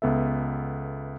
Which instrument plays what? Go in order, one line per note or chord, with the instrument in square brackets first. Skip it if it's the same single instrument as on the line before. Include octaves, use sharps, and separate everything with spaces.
[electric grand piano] C#2 B3 A4 E5